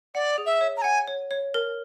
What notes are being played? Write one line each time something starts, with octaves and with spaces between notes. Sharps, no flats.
D5 F#5
G#4
E5
C#5
A#5
F#5 G#5
C#5
C#5
A#4